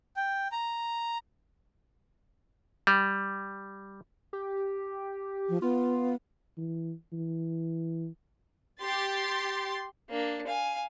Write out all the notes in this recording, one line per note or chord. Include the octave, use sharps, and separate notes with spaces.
G5
A#5
G3
G4
F3
B3 F4
E3
E3
G4 C6 A6
A#3 D4
F5 G#5